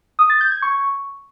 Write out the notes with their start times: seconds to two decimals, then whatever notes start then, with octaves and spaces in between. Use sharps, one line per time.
0.19 D#6
0.30 A6
0.41 G6
0.51 G#6
0.62 C#6